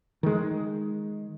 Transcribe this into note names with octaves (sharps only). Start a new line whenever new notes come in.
D#3 G#3